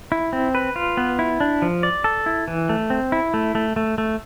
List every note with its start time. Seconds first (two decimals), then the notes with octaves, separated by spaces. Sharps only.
0.12 E4
0.33 C4
0.55 B4
0.76 F4
0.97 B3
1.19 E4
1.40 D4
1.62 F3
1.83 D5
2.04 A4
2.26 E4
2.48 E3
2.69 A3
2.90 C4
3.12 E4
3.34 A3
3.55 A3
3.76 A3
3.98 A3